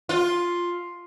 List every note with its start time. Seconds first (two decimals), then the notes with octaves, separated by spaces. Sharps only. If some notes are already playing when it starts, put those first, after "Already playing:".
0.09 F4